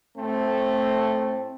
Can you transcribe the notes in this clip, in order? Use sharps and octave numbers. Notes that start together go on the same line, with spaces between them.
A2 A3 C4